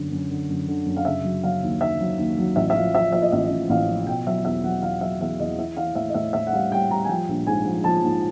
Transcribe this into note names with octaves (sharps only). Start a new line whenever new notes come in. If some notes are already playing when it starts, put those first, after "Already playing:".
Already playing: G1 F#2 D3
F#2
D3
F#2
D3
F#2
F5
C#3 E5
F#3
F#3 F5
D#2
D#2 E5
F#3
D#2
F#3
A1 E5
E5
F3 F5
F3 E5
F3 E5
D#5
A1 E5
A1
A1 F5
F3
B2 G5
F#3 E5
E2 E5
F#3 F#5
E2 F5
F#3 E5
E2 E5
E2 D#5
E3 E5
E3 F5
A2 E5
D#5
A2 E5
A2 E5
F#5
G3 F5
G3 G5
G3 A#5
G#5
F3 G5
A#1
G#2 G#5
F3
F3 A5
G#2